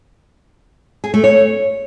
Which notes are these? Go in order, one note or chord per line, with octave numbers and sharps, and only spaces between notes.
G#4
A3
C#5